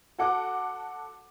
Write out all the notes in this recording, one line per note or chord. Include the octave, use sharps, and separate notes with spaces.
F#4 A4 F#5 D6